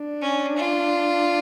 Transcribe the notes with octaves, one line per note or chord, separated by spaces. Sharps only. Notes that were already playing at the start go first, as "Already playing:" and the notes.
Already playing: D4
C#4
F4